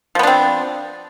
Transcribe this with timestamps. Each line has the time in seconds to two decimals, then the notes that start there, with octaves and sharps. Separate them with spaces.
0.15 F3
0.19 B3
0.23 D4
0.27 C4